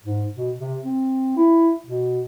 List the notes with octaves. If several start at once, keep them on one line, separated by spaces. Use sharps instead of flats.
G#2
B2
C3
C4
E4
B2